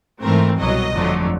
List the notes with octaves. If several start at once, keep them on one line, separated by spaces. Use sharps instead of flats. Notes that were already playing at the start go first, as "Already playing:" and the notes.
G#2 E3 A3 C4 A#4
C2 B2 F#3 D#5
G1 F2 D3 F#3 A3